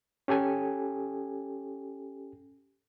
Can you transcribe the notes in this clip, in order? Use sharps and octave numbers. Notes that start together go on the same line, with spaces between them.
C#4 G4 A4 G#5